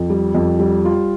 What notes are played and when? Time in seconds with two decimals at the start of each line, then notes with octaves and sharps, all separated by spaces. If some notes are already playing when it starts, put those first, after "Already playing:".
Already playing: F2
0.10 G3
0.35 F2
0.59 G3
0.85 F4